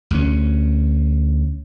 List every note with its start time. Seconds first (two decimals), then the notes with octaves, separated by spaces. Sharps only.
0.11 D2 C#4